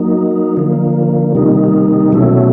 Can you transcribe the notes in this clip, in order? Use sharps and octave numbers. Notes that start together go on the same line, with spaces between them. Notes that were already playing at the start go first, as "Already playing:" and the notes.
Already playing: F#3 A#3 D#4
D3 F3 A#3
C3 D#3 G3 A#3 D#4
B2 F#3 A3 C#4 E4